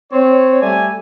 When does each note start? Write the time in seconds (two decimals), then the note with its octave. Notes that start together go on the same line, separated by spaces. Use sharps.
0.12 C4 C#5
0.61 G3 A3 D5 G#5